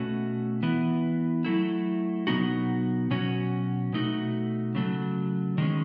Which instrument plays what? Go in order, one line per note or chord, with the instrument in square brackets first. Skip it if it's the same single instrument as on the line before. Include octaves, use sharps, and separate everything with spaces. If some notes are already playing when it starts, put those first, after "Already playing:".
Already playing: [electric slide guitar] B2 A3 C#4 F#4
E3 B3 E4
F#3 A3 E4
B2 F#3 B3 D#4 F#4
B2 F#3 C#4 F#4
B2 A3 D#4 F#4
C#3 F#3 A3
D#3 G#3 C#4